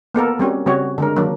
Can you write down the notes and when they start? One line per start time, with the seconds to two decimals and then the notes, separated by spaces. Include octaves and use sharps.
0.14 A#3 B3 A4 A#4
0.39 G3 C4 C#4 F#4
0.66 C#3 G3 C4 C#4 F#4 C#5
0.98 D3 G#3 A#4
1.16 D#3 F#3 A#3 D4